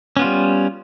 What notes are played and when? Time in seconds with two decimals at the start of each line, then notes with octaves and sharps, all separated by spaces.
0.17 C#4
0.19 B3
0.22 F4
0.24 G3